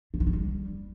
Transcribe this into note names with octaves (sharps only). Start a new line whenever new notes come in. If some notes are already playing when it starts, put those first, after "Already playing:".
D3
E3
F#3
G3